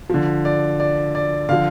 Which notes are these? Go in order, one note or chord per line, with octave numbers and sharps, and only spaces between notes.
D3 F3
D5
D5
D5
D3 F3 F5